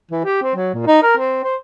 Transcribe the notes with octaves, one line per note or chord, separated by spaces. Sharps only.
E3
G4
C4
F#3
A#2
D#4
A#4
C4
C5